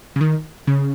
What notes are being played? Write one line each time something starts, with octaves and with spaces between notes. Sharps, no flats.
C#3
D#3
C#3